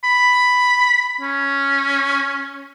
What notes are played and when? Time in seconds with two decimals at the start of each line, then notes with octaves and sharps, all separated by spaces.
0.04 B5
1.21 C#4